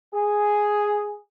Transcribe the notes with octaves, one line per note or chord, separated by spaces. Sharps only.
G#4